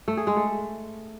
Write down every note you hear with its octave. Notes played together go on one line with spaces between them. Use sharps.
A3
G#4
G#3
A3